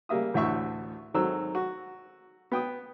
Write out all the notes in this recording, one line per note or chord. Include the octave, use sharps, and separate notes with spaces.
C#3 G3 A#3 E5 D#6
A1 D2 A2 E5 C#6 E6
G#2 D#3 F#3 C4 A4 E6
F#4
B3 G5 D#6